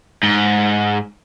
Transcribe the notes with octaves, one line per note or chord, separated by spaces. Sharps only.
G#2